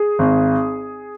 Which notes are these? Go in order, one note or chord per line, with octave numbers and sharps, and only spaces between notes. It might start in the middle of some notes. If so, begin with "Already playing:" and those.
Already playing: G#4
G#1